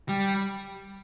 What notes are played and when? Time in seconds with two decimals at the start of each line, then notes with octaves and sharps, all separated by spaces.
0.09 G3